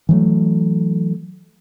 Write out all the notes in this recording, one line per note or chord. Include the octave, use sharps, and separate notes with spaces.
E3 F#3 A3